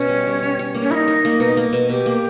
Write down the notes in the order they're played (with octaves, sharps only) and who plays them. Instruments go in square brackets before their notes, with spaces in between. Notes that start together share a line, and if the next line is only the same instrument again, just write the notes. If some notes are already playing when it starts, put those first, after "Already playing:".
Already playing: [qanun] B2 [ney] C#4
[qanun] G3
G3
C#5
C#5
A#3
[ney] C#4
[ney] D#4 E4 [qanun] A#4
[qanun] A#4
A#3
B2
A#3
B2
[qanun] B2 [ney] G4
[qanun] A#3